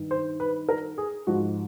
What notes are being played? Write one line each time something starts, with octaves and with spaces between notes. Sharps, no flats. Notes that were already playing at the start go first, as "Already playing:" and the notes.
Already playing: G2 D#3
C5
B4
A#4
G#4
G#2 F3 F#4